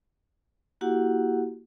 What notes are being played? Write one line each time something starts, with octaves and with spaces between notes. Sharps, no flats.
A#3 E4 F#4 G4 F#5